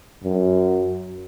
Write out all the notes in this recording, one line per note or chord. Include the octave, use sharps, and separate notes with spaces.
F#2